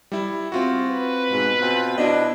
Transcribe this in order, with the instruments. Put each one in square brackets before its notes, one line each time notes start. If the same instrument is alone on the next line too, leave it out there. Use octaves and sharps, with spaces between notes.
[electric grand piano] G3 E4
C4 F4 F#4
[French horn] B4
[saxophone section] G#2 B2 G#3
B2 C4 F4
[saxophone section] B2 D4 [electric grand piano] E4 D#5